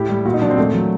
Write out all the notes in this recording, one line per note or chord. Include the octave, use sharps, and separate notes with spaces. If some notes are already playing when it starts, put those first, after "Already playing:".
Already playing: A2 G4
G3
A#2 F#4
D#4
F#3 D4
C4
A#2 A3
F#3